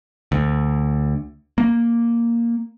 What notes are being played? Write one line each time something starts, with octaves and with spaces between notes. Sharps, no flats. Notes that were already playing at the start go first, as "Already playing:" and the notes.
D2
A#3